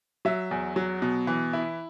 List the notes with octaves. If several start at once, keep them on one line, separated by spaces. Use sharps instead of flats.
F#3 E5
E2
F#3
B2
E3
E4